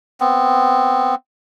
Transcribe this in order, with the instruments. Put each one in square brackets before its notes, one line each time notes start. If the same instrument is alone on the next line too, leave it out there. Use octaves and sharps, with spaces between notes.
[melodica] B3 C4